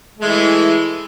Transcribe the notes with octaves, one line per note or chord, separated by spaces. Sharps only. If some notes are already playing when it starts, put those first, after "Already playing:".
E3 G#3 A3